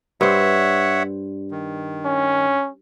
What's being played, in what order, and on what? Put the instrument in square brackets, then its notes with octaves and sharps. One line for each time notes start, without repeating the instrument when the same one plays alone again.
[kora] G2 C5 [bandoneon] C#5 E5 F#5
[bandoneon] D#3
[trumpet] C#4